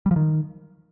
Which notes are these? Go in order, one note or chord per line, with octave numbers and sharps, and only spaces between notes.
G3
F3
D#3